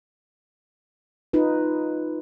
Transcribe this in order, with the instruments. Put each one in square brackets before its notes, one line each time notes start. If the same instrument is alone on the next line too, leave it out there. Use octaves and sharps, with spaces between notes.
[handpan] D#4 F4 B4